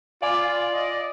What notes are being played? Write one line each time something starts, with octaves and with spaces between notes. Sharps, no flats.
F4 D5 F5 G#5 D6
D#5